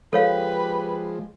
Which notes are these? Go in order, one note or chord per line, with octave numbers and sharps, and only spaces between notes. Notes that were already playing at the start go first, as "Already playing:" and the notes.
F3 G#3 G4 A4 B4 C#5 F5